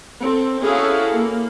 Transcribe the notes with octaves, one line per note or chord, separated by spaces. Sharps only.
C4 A4
C#4 E4 F#4 G#4 A4 F5
A#3